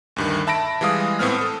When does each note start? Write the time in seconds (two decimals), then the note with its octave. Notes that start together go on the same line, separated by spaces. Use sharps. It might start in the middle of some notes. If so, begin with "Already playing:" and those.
0.16 D2 G2 D#3
0.47 E5 A5 B5 A#6 D7
0.81 E3 G3 G#3 F5 D#6
1.19 A2 A3 B3 C4 F6
1.38 A4 D#6